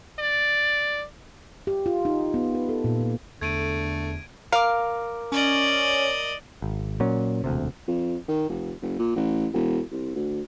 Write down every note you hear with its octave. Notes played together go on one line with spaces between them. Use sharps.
D5
G4
F4
D#4
B3
B4
A4
A#2
A#3
E2 D3 A3 G#6 D7 D#7
A#4 F5 D6
C#4 D5 D#5
G#1
A#2 F#3 C#4
E1 D2 C3
F2
D#3
F1
F#1
A#2
A1
E1
C2
D2